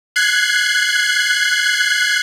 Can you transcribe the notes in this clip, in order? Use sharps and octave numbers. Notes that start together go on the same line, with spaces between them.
F#6 G#6 C7